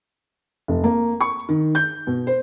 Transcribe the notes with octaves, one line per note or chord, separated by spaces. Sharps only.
F1
A#3
C#6
D#3
G6
B2
C5